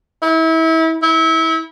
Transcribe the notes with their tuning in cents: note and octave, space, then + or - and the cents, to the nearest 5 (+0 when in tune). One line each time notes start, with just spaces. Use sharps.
E4 -30
E4 -30